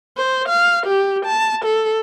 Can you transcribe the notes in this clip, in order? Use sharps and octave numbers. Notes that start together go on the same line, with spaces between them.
C5
F5
G4
A5
A4